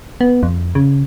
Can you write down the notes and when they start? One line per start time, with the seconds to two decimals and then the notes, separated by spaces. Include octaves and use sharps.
0.21 B3
0.43 F2
0.75 C#3